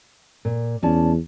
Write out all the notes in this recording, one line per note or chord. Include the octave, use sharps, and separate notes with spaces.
A#2
E2 C#4 D5 A5